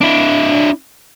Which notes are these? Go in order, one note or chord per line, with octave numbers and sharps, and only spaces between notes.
D4 E4